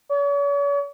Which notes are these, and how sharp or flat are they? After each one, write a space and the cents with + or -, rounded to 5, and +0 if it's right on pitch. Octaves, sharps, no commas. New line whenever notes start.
C#5 +45